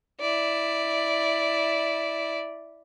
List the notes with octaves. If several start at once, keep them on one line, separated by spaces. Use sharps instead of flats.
E4 D5